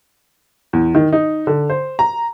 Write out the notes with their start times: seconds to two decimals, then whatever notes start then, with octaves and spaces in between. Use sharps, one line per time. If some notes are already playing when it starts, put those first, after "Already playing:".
0.73 E2
0.95 D#3
1.13 D#4
1.47 D3
1.70 C5
1.99 A#5